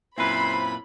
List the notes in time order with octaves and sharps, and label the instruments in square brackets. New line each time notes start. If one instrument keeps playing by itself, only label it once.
[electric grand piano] F#2 C4 E4 [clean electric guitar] A#2 B4 [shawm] C5 [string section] B5